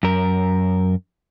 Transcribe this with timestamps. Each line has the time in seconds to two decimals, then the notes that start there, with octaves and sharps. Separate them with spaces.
0.03 F#2 A#4